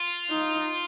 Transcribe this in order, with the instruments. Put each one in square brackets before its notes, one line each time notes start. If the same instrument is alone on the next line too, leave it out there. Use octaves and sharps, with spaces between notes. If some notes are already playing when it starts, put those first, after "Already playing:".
Already playing: [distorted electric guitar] F4
[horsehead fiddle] D#4